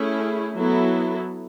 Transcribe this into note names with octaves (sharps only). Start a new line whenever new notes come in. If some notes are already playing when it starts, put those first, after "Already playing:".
Already playing: A3 C#4 E4 G#4
F#3 B3 E4 A4